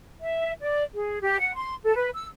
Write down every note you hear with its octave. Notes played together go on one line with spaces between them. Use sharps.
E5
D5
G#4
G4
F#5
C6
A4
B4
E6